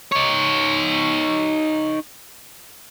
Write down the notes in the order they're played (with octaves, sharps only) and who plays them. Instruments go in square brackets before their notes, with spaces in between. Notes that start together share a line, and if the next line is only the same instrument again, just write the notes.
[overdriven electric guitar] D#4 C#5